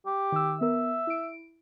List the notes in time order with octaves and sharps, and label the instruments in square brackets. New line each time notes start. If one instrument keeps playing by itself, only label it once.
[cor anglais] G4
[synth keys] D#3 E6
[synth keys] B3 A#4 [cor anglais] E5
[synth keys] E4 D7